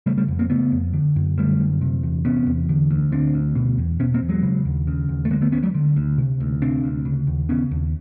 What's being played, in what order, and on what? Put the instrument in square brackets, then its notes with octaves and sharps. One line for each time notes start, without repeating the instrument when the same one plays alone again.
[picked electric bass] C#3 G3 A3
G3 A3
F2
A#3 C4
C#3 A3 B3
F2
D3
F#2
D3 G3 A3
F#2
C3
E2
C3 B3 C#4
E2
D3
D2
D3 C4 D4
D2
B2
E2
B2 B3 C#4
A#3 C4
E2
F#3 G#3
C#3
D#2
C#3
D#2
A3
D3 G#3 A#3
A3 B3
D2 B3 C#4
F#3 G#3
D3
D2
C3
D2
C3 C4 D4
D2
C#3
D#2
C#3 B3 C#4
D#2